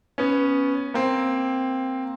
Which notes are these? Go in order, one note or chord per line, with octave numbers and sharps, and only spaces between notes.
B3 C#4
A#3 C4